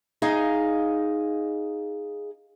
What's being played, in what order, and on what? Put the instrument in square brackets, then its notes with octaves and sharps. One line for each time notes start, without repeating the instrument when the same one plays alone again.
[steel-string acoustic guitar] D#4 G#4 D#5 F5